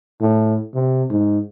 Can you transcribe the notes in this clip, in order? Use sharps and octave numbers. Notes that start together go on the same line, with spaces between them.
A2
C3
G#2